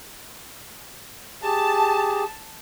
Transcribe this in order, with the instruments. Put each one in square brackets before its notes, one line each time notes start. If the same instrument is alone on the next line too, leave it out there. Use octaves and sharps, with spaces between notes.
[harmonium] G4 G#4 [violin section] A5